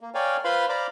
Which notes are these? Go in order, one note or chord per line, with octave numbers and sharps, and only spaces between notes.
A#3
A#4 C#5 D5 F5 G5 G#5
F4 B4 C5 F5 B5 C6
C5 D5 F5 A#5 B5 D6